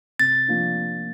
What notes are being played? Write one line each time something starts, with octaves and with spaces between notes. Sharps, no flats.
C3 A6
F3 A#3 D4 F4